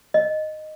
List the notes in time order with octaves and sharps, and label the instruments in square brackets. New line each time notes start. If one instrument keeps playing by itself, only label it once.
[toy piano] D#5